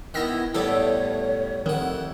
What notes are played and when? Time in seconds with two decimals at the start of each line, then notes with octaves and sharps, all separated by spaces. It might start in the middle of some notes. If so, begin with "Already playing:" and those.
0.14 D#3 B3 E4 E6 F6 A#6
0.55 A2 G3 A3 B3 A4 C#5 D5
1.66 F2 D#3 E4 F#5